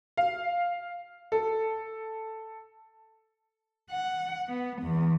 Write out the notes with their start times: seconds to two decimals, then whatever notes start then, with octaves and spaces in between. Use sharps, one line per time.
0.17 F5
1.32 A4
3.91 F#5
4.47 B3
4.81 E2